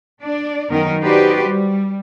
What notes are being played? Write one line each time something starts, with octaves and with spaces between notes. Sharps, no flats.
D4 D5
F#2 D#3 B3 D#4 A#4
D#4 F#4 G4 B4 C5 D5
G3